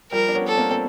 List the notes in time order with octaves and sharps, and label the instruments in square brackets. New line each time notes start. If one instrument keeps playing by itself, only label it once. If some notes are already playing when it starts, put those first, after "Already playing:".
[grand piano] F3 G3 [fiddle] A#4
[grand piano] D4
B3 C#4
[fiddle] A4
[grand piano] A#3 C4
C4